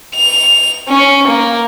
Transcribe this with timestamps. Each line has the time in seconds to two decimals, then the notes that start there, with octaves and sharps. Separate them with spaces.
0.16 F7
0.88 C#4
1.28 A#3